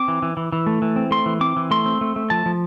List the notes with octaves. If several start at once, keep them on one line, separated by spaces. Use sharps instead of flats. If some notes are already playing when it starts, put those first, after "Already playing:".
Already playing: C4 D6
E3
E3
E3
E3
A3
E3
C4
A3 C6
E3
C4 D6
E3
A3 C6
C4
A3
A3
F3 A5
F3